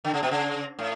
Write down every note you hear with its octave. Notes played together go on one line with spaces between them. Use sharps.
D3
C#3
B2
C#3
A2